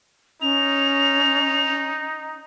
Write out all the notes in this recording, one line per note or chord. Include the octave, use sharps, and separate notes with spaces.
C#4 D#4 F7